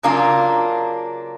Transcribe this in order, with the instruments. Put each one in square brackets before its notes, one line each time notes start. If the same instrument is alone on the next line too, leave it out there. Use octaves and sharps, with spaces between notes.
[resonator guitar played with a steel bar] C#3 F#3 A#3 D4 F4